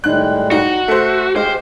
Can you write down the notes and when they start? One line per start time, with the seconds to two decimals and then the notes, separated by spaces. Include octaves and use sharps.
0.04 A2 D#3 G3 G#3 F#6
0.51 D#4 F#4
0.88 A3 C5 E5
1.36 G#3 G4 C5 F5